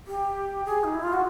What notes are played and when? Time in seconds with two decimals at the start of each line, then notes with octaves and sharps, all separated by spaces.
0.07 G4
0.65 G#4
0.84 D#4
0.94 E4
1.03 F4
1.13 F#4